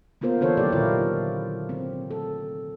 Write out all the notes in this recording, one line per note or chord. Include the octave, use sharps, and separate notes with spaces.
A#3 B3 F4 A#4 C5
D3 E3 D4 A4 C5 C#5
D#3 F#3 E4 G4 D5
A#2 D3 E4 F4 G4 A#4
C4
A4